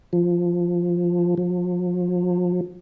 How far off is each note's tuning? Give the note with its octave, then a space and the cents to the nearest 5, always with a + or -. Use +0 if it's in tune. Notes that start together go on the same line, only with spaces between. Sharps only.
F3 +0
F3 +35